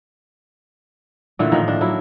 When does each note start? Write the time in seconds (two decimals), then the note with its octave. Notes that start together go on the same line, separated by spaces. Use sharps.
1.39 A#2 D3 E3 A3
1.52 A2 D#3 F3 A#3
1.68 D4
1.81 F#3 A#3 E4